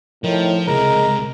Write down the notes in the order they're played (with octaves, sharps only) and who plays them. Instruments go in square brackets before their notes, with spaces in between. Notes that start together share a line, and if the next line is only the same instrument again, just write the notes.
[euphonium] A2 [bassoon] D#3 [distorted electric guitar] F3
[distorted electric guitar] C#2 C3 [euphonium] G#3 [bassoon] A#4